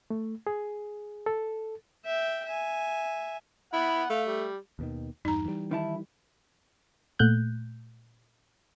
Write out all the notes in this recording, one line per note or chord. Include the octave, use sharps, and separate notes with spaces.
A3
G#4
A4
E5 G5
E5 G#5
E4 F#5 B5
A3 F5
G3
D#2 B2 D#3
E2 G2 D#4 A#5
E3 G3
D#3 E4 A5
A#2 A3 F#6 G6